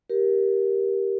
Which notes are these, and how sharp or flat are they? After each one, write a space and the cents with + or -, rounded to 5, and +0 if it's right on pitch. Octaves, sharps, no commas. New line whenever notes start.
G4 +0 A#4 +15